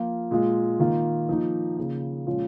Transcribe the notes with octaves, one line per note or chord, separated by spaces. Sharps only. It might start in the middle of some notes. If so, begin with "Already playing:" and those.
Already playing: F3 A#3 F4
A#2 G#3 F4
D#3 A#3 F4
F3 A#3 D#4
C#3 A#3 F4
A#2 F3 G#3 C#4 F4